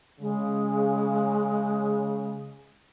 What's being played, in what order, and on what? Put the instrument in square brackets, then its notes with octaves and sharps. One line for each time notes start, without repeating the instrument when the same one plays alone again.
[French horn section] C#3 [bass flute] G#3